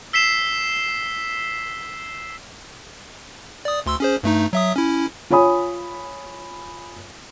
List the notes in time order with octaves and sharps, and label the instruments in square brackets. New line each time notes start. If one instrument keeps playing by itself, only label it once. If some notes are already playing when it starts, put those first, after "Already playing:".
[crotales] E6 B6 C7 E7
[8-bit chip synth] D5 D#6
D2 C6 E6
C#4 G#4 C5
G2 A3 D#4
F#3 E5 D#6
C#4 E4
[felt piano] F4 C#5 G#5 B5 D#6